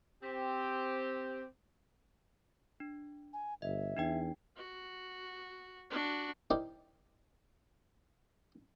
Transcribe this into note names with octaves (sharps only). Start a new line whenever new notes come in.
C4 G4
D4
G#5
G1 D#5 E5
E2 D4 D#4 G5
F#4
D4 F#4
D#4 E4 G4 A#4 C5 D5